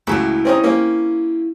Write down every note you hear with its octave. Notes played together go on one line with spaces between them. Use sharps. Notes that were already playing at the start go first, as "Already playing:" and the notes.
C#2 A2 F#3 E4 E5 F5
C4 C#4 D#4
A#3 C4 C#4